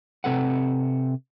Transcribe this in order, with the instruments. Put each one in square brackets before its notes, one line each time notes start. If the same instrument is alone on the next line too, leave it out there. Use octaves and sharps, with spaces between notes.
[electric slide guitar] C3 C4 A4 B4 F#5